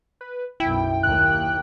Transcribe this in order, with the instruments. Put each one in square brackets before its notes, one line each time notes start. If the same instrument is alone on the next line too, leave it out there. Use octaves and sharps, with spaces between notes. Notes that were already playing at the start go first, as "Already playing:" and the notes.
[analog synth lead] B4
[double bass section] B1 F#2 [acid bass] E4 [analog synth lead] G5
[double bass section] D#2 A#3 [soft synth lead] F#6